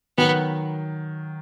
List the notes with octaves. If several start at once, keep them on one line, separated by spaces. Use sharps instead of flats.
D#3 F#3 B3